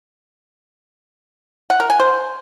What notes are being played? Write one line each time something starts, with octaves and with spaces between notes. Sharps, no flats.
F#5
A#4
G#5
C5